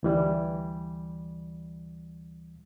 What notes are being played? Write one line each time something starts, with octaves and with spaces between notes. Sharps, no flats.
D2 E3 G3